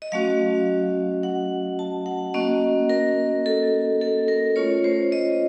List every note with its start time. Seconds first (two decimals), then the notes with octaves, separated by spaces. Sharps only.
0.02 D#5
0.12 F#3 A3 C#4 F#4 F5
1.23 F#5
1.79 A5
2.06 F#5
2.34 A#3 C#4 F#4 D#5
2.89 A#4
3.46 A4
4.01 A4
4.28 A#4
4.56 A3 C#4 F4 C#5
4.84 C5
5.12 D#5